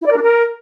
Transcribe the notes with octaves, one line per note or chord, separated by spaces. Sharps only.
E4
D5
A#4
D4
A#4